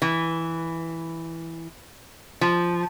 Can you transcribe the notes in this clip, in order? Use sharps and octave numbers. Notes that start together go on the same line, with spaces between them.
E3
F3